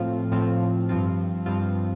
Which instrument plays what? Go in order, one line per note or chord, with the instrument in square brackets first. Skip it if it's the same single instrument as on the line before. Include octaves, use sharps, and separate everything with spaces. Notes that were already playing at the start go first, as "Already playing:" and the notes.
Already playing: [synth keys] A2 F3 C4 F4
A2 F3 C4 F4
G2 F3 C4 F4
G2 F3 C4 F4